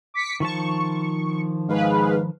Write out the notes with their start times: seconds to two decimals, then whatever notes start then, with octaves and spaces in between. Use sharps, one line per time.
0.14 D6 B6 C#7
0.40 D#3 F3 A5 C#6
1.69 G#2 G#4 B4 F5